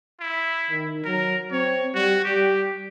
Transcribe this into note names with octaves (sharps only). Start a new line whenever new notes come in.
E4
D#3
F#3 A#4
C4 C#5
G3 F#4
G3 G4